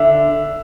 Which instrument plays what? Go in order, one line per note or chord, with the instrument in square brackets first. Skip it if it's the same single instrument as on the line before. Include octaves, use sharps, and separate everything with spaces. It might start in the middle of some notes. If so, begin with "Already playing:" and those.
Already playing: [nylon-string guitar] D3 [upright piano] E5